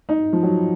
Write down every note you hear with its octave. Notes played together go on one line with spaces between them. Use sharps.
D#4
F3
F#3